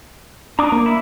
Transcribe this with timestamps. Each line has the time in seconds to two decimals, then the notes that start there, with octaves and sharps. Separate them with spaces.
0.59 D4 A#5 D6 D#6
0.72 A#3
0.86 E4